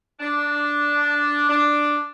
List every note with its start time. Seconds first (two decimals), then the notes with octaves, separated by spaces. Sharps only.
0.20 D4
1.49 D4